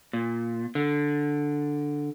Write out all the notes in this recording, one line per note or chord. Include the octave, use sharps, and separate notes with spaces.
A#2
D3